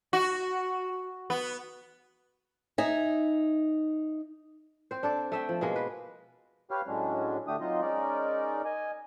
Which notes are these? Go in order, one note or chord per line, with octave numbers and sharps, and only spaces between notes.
F#4
B3
D#4 E5 G#5
C4 C5
D4 A4 D5
A3 E5 G5
F3
B2 G#3 A#3
B4
G4 B4 C#5 F5 F6
A2 F#3 G#3 C#4 D4
D3 A3 D4 G4 D#6
F#3 C4 D#4 F4 D#5
G#3 C#4 D#4 A#4 D5
D#5 G#5